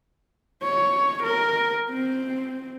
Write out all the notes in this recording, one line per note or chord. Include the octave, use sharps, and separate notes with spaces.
C#5
A#4
C4